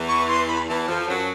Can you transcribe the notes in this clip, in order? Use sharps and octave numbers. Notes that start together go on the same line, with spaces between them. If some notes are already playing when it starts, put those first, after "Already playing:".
Already playing: E2 E3
C#6
C6
B5
E2 E3 A5
F2 F3 A5
A5
F#2 F#3
A5